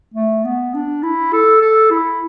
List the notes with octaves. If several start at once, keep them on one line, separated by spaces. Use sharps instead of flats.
A3
B3
D4
E4
A4
A4
E4